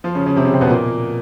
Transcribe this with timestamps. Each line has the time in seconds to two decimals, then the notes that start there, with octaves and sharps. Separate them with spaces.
0.04 F3 F4
0.15 C#3 C#4
0.26 C#3 C#4
0.37 C3 C4
0.45 C#3 C#4
0.53 C3 C4
0.61 B2 B3
0.69 A#2 A#3